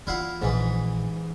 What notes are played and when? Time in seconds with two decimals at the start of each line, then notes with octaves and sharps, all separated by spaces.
0.07 E3 E4 F4 F5 F#5
0.42 A#1 G#2 E3